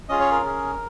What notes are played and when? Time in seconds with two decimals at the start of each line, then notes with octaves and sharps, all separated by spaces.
0.09 C#4 F4 G#4 D#5
0.20 C#5
0.31 A#4
0.42 C#4 G#4